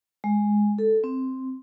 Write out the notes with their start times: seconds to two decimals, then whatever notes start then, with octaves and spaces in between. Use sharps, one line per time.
0.24 G#3
0.79 A4
1.04 C4